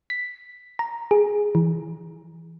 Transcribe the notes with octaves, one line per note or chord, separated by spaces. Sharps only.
B6
A#5
G#4
E3